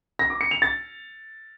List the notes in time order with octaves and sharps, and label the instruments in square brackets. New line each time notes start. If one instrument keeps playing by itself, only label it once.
[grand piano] A#6
D6
C#7
F7
A6